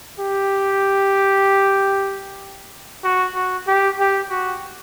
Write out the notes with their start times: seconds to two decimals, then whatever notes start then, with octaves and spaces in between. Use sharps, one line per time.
0.19 G4
3.04 F#4
3.35 F#4
3.67 G4
3.99 G4
4.30 F#4